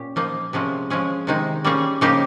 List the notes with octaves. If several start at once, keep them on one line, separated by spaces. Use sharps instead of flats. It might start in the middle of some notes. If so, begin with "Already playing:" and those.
Already playing: A#2 C#4 G4
F3 A#3 D#4
C3 F3 G#3 C#4
F3 G#3 C#4 G#4
C3 D#3 G#3 D#4
G3 A#3 C#4 G#4
C#3 F3 A#3 D#4 G4